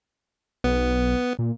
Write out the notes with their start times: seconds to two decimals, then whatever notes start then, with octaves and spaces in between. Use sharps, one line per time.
0.64 B1 B3
1.39 A#2